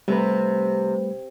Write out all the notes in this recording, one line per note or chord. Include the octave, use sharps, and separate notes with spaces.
C3 G3 A3 B4